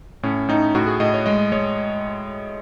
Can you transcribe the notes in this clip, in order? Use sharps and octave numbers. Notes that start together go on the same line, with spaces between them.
A2 C#4
A2 D#4
A2 F#4
G#4
A2 D#5
C#5
G#3 D#5
G#3 C#5